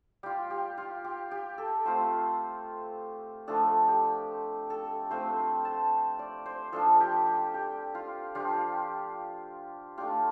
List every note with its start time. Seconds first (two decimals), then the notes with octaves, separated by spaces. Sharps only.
0.23 G3 F4 G4
0.50 G4
0.78 F4
1.04 G4
1.31 G4
1.58 A4
1.85 A3 C4 F4 C5
3.48 F3 A3 D4 A4
3.88 G4
4.70 A4
5.11 A3 C4 F4 C5
5.38 C6
5.65 A5
6.19 D5
6.46 C5
6.73 F3 D4 F4 A4
7.00 G4
7.27 G4
7.54 G4
7.95 F4
8.35 F3 D4 F4 G4
9.98 A3 D4 F4 G4